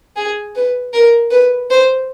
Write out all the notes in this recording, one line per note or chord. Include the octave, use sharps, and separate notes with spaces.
G#4
B4
A#4
B4
C5